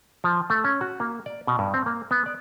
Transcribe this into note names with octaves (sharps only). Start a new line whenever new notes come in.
F3
A3
C#4
F#4
A#3
D5
B2
G2
C4
A#3
B3
D5